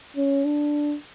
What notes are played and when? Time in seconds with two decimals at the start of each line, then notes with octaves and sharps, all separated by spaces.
0.16 C#4
0.45 D4